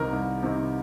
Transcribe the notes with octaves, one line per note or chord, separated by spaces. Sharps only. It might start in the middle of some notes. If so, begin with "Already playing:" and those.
Already playing: C2 C3 D#3 A#4
C2
C3 D#3